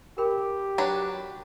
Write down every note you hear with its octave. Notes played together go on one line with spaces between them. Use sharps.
G4 A#4 G5 B5
F#3 D4 B4